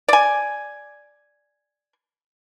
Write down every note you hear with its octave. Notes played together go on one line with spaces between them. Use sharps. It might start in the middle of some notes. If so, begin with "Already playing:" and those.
D5 G#5